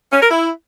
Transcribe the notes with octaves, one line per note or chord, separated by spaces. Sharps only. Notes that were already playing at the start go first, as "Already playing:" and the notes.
C#4
A#4
E4